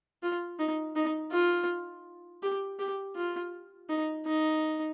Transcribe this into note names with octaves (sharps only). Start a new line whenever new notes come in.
F4
D#4
D#4
F4
G4
G4
F4
D#4
D#4